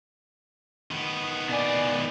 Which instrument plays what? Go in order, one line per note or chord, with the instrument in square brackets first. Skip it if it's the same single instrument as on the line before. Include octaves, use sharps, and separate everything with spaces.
[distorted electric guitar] D#3 B3
[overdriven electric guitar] B2 G#5 [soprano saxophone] D5